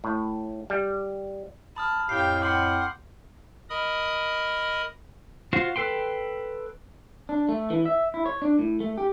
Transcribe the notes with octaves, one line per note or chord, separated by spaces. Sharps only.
A2
G3
A5 B5 D#6 F6
F2 A2 G4 F5 G5 C7
F#5 G5 C6 D6 F6 F#7
A#4 D#5 B5 D#6
F4 F#4 C5
A4 B4 G5 C6
D4
A3
E3
E5
E4
C#5
D4
A2
A3
G4